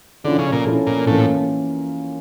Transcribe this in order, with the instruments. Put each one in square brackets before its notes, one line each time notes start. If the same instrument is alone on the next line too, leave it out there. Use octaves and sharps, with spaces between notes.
[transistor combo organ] D3 [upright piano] F3 C#4 E4 A4
[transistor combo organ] C#3
A#2
[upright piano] F3 C#4 E4 A4
[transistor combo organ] A#2
[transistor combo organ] A2 [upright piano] E3 A#3 C#4 F4